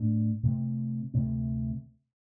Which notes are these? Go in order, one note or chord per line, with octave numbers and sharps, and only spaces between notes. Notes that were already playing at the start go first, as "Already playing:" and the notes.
Already playing: A2 A3 D4
C3 A3 C4
D2 C3 A3 C4